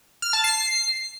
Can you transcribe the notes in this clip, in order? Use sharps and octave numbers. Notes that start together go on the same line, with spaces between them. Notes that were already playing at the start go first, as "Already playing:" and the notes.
F6
A5
C7